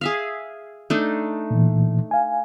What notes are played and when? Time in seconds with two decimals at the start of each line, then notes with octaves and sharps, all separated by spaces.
0.01 G#4 E5 F5
0.90 A3 D4 D#4
1.51 A#2 E3
2.11 F5 G#5